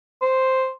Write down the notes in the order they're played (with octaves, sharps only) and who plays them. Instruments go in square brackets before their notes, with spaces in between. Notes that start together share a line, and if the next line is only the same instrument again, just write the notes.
[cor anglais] C5